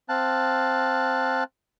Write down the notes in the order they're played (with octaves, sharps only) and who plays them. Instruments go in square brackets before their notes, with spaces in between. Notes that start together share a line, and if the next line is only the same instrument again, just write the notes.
[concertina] C4 F5 A5 F#6